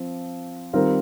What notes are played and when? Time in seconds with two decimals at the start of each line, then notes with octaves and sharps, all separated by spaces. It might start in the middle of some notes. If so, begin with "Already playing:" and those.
Already playing: F3 C4
0.73 D#3 G3 C4 F4 A#4